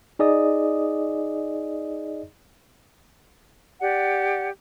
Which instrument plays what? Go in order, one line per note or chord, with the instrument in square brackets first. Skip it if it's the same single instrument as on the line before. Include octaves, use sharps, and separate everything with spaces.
[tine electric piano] D#4 G#4 D5 D#5 D#6
[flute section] G4 D5 F#5